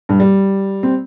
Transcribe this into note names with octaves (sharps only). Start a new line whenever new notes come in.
G2
G3
C4